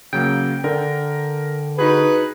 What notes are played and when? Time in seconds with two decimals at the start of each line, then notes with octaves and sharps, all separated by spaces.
0.13 C#3 F#3 A#3 G5
0.64 D3 A#4 G5
1.79 D#4 F#4 G#4 B4